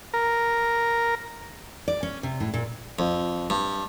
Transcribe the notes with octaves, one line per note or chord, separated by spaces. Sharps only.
A#4
D5
C#4
C3
A2
A#2
F2
G2